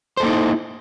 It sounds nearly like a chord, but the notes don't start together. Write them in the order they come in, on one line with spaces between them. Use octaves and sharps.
C5 A4 A#3 D#4 E4